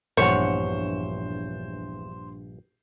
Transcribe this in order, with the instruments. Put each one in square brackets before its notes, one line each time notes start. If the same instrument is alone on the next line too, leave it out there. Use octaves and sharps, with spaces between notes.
[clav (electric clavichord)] A#1 G2 [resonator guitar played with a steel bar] E2 C#5 F#5 [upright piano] C5 [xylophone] C#6 C#7